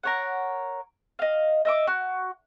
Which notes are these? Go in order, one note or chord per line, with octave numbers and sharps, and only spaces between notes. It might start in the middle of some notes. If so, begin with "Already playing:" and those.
A#4 C#5 F#5
D#5 F5
D#5 E5 D6
F#4